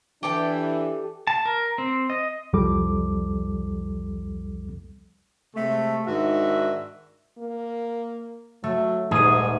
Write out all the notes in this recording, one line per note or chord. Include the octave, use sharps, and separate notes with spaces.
E3 D4 G4 A4 G5
A5
A#4
C4
D#5
C2 F2 F3 G3 A4 D6
C3 G#3 A3
G#2 D#3 D4 F#4 E5
A#3
F#3 A3
D#1 G#2 A3 G#4 D#7